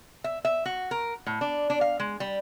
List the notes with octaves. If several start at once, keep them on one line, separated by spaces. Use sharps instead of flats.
E5
E5
F#4
A#4
A2
D4
D4
F5
G#3
G3